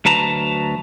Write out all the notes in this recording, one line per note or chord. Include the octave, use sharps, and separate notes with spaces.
D2 F#3 B4 A5 A#5